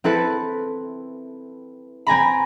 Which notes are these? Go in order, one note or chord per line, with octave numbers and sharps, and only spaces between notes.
C4 E4 A4 B4
C4 G#5 A#5 B5